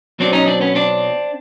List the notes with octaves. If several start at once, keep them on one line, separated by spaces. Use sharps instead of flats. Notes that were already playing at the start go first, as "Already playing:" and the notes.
B1 B2 F#3 C4 D4
C#4 D#4
C4 D4
B3 C#4
C4 D4